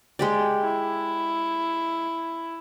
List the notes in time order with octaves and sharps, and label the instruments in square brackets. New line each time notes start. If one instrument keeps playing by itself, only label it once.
[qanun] G#3 G4 D5
[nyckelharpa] E4